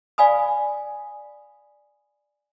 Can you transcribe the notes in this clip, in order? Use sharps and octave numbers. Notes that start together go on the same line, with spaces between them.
D5 F5 G#5 B5 D#6